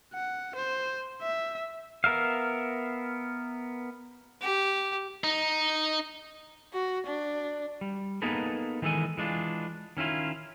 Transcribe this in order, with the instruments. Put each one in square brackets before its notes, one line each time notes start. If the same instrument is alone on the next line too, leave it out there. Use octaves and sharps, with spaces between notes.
[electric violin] F#5
C5
E5
[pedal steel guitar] B3 A#4 E5 F5
[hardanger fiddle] G4
[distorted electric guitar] D#4
[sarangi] F#4
D4
[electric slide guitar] G3
A#3 B3 D#4 G#4 A4 B4
D#3 E3 G#3 A4 G#5
E3 G#3 D4 F4
D#3 C#4 E4 F4